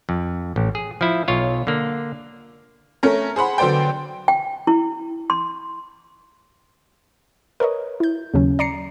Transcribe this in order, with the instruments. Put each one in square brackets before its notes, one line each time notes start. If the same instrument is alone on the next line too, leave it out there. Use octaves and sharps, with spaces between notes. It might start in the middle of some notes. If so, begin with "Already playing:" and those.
[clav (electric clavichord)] F2
A1
G#4
F3 E4
B1 F4 C#5
D3 A#3
[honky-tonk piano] A3 C#4 A#4
G#4 C5 F#5 B5
D3 F#3 B3 C5 D5 G5
[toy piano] G5
E4
C6
[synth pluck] A#4 B4 C#5 D#5
E4 G6
D#2 C#3 F#3 C#4
D5 A#5 C7 C#7